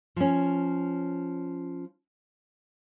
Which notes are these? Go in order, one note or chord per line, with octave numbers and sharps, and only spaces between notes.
F3 C#4